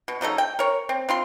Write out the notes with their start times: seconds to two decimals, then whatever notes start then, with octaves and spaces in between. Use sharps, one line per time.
0.08 B2
0.21 C#3 F#3 D#4 A4
0.38 G5
0.59 A#4 C#5
0.89 C4
1.09 C4 F4 C6